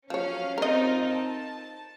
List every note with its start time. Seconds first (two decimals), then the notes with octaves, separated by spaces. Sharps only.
0.10 F3 F#3 C#4 C#5 F5
0.58 C4 D#4 F4 A#4 D#5
1.10 A5